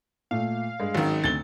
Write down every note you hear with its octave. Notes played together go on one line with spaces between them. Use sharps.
A#2 A3 F5
G2 G#3
G#1 D#3 F#3 C#4 F#4
D2 C3 A6 G7